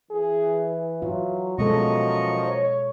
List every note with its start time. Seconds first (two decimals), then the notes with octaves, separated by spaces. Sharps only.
0.11 E3 G#4
1.02 F#3 F4
1.58 F#2 B2 F3 G#3 A4 D#5 A#5 C#6
2.47 C#5